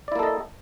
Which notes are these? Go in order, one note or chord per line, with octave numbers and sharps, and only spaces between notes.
A#3 E4 A4 D5 D#5